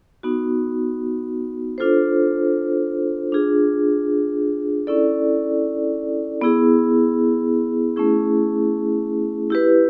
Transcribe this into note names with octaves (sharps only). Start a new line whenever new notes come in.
B3 D#4 F#4
D4 F4 A4 C5
D4 F4 G#4
C#4 E4 A4 D5
B3 E4 G#4
A3 C#4 E4 G#4
E4 G4 B4